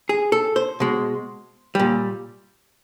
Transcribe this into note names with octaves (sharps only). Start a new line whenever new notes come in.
G#4
A4
C5
B2 G#3
A#2 G3